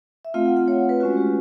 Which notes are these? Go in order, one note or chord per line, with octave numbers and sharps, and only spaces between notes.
E5
A3 C4 F4 F5
F#5
F#5
C#5
B4
G#3 C#4 F4 F#4
G4